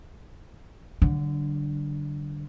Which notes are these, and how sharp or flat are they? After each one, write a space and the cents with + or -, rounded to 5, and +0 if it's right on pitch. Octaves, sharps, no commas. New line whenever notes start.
D3 +0 G3 -45